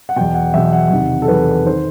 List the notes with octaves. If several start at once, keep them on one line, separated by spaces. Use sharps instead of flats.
F#5
E2 B2 G5
F#5
E2 B2 E5
F#5
E2 C3 D#3
A4
E2 C3 D#3 B4
D#3 C5